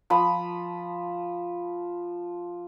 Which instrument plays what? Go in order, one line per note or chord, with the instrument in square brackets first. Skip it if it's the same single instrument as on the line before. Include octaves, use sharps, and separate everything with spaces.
[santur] F3 B5